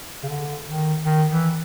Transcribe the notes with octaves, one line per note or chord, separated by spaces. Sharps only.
C#3
D3
D#3
D#3
E3